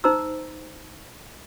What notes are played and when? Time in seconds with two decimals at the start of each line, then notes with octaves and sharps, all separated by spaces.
0.04 D#4 C5 A#5 E6